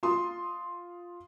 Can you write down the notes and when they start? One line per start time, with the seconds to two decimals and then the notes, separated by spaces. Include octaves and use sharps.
0.03 F4 C6 D#6